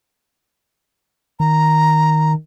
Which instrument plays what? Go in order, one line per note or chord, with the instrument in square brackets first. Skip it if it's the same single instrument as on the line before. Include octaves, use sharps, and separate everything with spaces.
[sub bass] D#3 [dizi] A#5